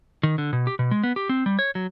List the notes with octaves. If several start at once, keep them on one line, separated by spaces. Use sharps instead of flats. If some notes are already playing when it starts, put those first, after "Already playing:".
D#3
D3
B2
G4
B2
G#3
B3
G4
C4
G3
C#5
F#3